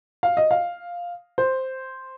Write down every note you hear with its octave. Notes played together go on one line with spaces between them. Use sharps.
F5
D#5
F5
C5